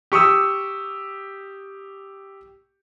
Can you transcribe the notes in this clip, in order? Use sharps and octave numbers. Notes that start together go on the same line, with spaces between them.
G4 C#6 D#6 E6